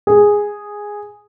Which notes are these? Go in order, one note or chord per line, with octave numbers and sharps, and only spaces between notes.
G#4